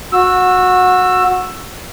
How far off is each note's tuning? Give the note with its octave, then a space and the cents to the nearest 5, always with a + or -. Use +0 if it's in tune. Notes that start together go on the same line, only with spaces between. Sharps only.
F#4 -20 E6 +10